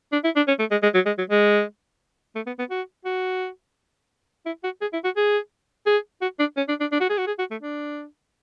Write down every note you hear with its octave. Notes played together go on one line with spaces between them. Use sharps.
D4
E4
D4
C#4
A3
G#3
G#3
F#3
G#3
F#3
G#3
A3
B3
B3
F#4
F#4
E4
F#4
G#4
E4
F#4
G#4
G#4
F#4
D4
C#4
D4
D4
D4
F#4
G#4
F#4
G#4
F#4
A3
D4